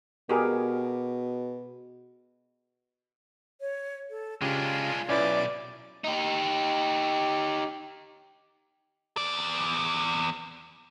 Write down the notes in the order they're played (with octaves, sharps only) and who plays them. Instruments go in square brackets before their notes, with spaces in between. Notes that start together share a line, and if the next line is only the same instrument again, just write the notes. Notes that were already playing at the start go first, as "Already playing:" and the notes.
[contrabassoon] B2 [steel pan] G4 G#4 A#4
[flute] C#5
A4
[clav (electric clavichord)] C#3 G4 [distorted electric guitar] G#3 D4 [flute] F4
[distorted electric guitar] B1 [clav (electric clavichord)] C#4 E4 B4 [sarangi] D5
[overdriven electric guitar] D#4 G4
[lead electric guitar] E2 D5